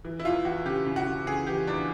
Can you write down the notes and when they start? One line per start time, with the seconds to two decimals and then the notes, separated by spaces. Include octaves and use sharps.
0.05 E3
0.20 E4
0.25 E2 F4
0.45 E3 F#4
0.66 C#3 G4
0.86 C#3
0.96 F#4
1.06 C#3
1.27 C#3 G#4
1.47 E3 G4
1.67 E2 D4